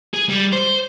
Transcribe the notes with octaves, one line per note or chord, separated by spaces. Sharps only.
G#4
G3
C5